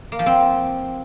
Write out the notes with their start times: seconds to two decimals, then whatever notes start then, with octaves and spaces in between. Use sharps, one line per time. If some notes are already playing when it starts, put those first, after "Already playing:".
0.12 A#3
0.19 F3
0.26 C4